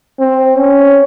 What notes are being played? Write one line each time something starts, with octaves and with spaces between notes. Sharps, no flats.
C4
C#4